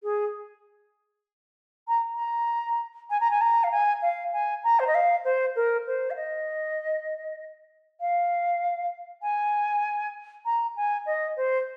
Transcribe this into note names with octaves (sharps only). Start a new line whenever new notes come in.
G#4
A#5
A#5
G#5
A#5
G#5
A#5
F5
G#5
F5
G#5
A#5
C5
D#5
F5
C5
A#4
C5
F5
D#5
F5
G#5
A#5
G#5
D#5
C5